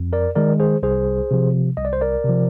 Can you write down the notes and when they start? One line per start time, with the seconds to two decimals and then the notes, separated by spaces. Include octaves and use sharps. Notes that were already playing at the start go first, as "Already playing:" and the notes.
Already playing: F2
0.13 A#4 D5
0.35 D#3 G#3 A#4 D5
0.60 G#4 C5
0.83 C2 G#4 C5
1.31 C3 F3
1.77 C2 D#5
1.85 D5
1.93 C5
2.01 A#4 D5
2.24 C3 F3